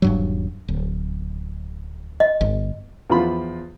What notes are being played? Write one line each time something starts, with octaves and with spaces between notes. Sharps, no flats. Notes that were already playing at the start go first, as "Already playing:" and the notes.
D#1 G2 F#3
D1
D#5
G1
E2 F3 F4 B5